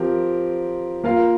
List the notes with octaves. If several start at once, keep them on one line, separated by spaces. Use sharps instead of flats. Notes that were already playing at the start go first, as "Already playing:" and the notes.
Already playing: F3 C4 G4 A#4
A#3 F4 A#4 F5